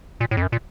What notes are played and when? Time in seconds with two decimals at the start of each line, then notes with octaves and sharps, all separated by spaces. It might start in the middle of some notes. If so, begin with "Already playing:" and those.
0.21 A#2
0.31 A2
0.37 F2
0.42 F#2
0.52 A#2